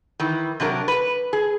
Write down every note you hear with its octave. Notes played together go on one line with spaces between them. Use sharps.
D#3 E3
C3 F#3 D4 A#4
B4
G#4